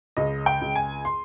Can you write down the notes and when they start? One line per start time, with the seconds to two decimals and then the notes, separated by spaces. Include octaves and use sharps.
0.17 C#2 D#5
0.46 G5
0.62 C#2
0.76 G#5
1.05 C6